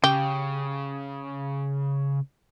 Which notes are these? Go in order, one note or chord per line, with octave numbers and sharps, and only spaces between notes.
C#3 G4